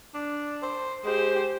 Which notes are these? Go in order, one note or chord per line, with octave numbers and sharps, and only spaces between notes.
D4
C5
G#3 G4 C5